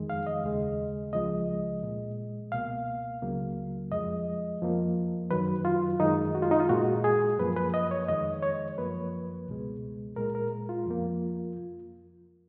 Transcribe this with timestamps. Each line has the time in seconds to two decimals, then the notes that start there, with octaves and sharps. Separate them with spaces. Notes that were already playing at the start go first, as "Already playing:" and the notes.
Already playing: F2 D#3 G#3
0.10 F5
0.27 D#5
0.44 D#2 C#3 G#3
1.13 C#2 C#3 F3 G#3 D#5
1.83 A#2 G#3
2.52 C#2 B2 A#3 F5
3.22 C#2 C#3 F#3 A#3
3.92 F2 F3 G#3 D#5
4.62 F2 F3 A#3
5.31 F#2 D#3 F#3 B4
5.65 F4
6.00 F#2 D#3 G#3 D#4
6.35 F#4
6.42 F4
6.51 D#4
6.60 F4
6.69 A#2 G#3 F#4
7.04 G#4
7.39 F#2 F3 A#3 B4
7.56 B4
7.74 D#5
7.91 C#5
8.09 F2 D#3 G#3 D#5
8.43 C#5
8.78 F#2 F3 A#3 B4
9.47 C#2 B2 G#3
10.16 A#2 G#3 A#4
10.35 A#4
10.69 F4
10.86 F2 F3 A#3